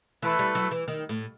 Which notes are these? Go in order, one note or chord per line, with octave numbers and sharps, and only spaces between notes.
E3 A3 E4 B4
G3
F#3
E3
D#3
A2